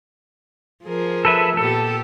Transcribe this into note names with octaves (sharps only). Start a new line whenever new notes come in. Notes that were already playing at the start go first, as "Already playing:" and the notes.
F3 G#4 A#4
A4 B4 E5
A#2 B3 G4 A4